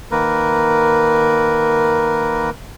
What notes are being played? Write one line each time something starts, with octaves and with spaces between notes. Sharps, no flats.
D#3 A#3 A#4 B4